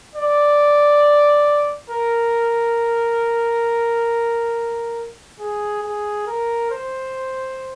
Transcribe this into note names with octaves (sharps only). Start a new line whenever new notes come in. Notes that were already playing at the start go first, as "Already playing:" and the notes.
D5
A#4
G#4
G#4
A#4
C5